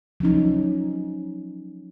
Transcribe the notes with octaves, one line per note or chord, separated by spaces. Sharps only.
F3 F#3 C#4 D#4